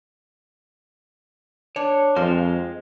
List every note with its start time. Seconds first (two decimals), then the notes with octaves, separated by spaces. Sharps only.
1.76 D4 C#5
2.16 F2 F3 G#3 C5 F6